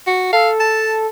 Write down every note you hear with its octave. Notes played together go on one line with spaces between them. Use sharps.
F#4
A4 F5
A5